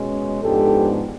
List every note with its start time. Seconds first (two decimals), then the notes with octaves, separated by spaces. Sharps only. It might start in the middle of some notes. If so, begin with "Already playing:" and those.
Already playing: B2 G#3 C#4
0.43 G#2 F3 G#3 B3 D4 G4 A4